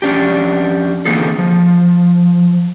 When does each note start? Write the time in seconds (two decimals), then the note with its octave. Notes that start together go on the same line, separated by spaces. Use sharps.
0.02 F2 C#4 D4 G4
1.05 D3 E3 A#3 C4 G#4 A4
1.39 F3